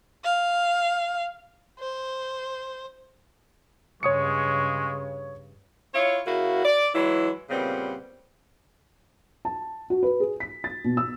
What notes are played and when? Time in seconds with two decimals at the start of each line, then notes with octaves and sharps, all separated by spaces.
0.25 F5
1.80 C5
4.03 G2 C#3 G#3 C#5 C#6 D#6 C#7
5.94 E4 F4 C#5
6.27 C#3 A#3 E4 F#4
6.65 D5
6.95 E3 F#3 G#3 E4
7.50 A#2 C#3 G3 B3 C4
9.45 A5
9.90 F#4
10.03 B4
10.20 G#4
10.40 B6
10.64 A6
10.85 B2
10.97 E6